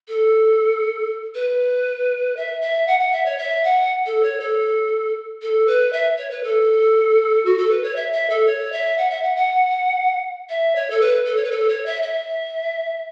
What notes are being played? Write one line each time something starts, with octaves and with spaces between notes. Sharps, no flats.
A4
B4
E5
E5
F#5
F#5
E5
C#5
E5
F#5
A4
C#5
A4
A4
B4
E5
C#5
B4
A4
F#4
A4
B4
C#5
E5
E5
A4
C#5
E5
F#5
E5
F#5
F#5
E5
C#5
A4
B4
A4
C#5
B4
A4
C#5
E5
E5